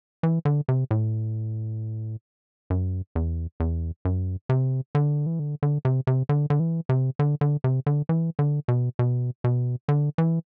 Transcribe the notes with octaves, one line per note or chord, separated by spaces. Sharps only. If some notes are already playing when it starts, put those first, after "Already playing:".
E3
D3
C3
A2
F#2
E2
E2
F#2
C3
D3
E3
D3
D3
C3
C3
D3
D3
E3
C3
D3
D3
C3
D3
E3
D3
B2
B2
B2
D3
E3